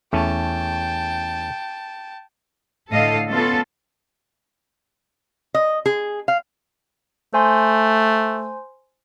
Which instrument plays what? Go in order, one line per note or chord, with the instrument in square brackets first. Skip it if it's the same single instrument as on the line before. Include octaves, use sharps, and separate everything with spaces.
[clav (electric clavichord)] E2 A3 C#4 [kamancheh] G5 A5
[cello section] A2 D3 A4 D#5 F5
A3 B3 C#4 F4 A4
[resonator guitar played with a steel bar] D#5
G#4
F5
[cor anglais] A3 [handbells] C5 G#5 C6